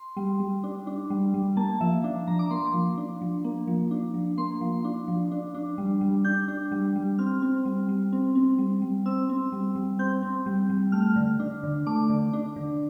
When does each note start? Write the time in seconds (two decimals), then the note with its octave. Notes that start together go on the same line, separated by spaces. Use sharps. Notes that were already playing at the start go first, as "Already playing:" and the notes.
Already playing: C6
0.17 G3
0.40 G3
0.64 D4
0.87 D4
1.10 G3
1.34 G3
1.57 A#3 A5
1.81 F3 E5
2.04 D4
2.27 F3 A#5
2.39 D6
2.51 A#3 C6
2.74 F3
2.98 D4
3.21 F3
3.44 A#3
3.67 F3
3.91 D4
4.14 F3
4.38 A#3 C6
4.61 F3
4.85 D4
5.08 F3
5.31 D4
5.55 D4
5.78 G3
6.01 G3
6.25 D4 G6
6.48 D4
6.72 G3
6.96 G3
7.19 C4 F6
7.42 C4
7.65 G3
7.89 G3
8.12 C4
8.35 C4
8.58 G3
8.82 G3
9.05 C4 E6
9.29 C4
9.52 G3
9.75 G3
9.99 C4 G6
10.23 C4
10.46 G3
10.69 G3
10.92 A3 F6
11.16 D3
11.40 D4
11.63 D3
11.86 A3 D6
12.10 D3
12.33 D4
12.56 D3